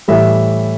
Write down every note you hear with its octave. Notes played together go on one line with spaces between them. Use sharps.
A2 E3 G3 E5